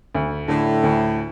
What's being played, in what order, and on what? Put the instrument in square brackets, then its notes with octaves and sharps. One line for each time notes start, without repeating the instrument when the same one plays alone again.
[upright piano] D2
[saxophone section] A2 [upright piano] D3 A3
[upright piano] D2